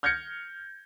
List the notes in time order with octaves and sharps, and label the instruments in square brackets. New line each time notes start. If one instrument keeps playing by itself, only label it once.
[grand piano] F6 G6 G#6 A#6 C#7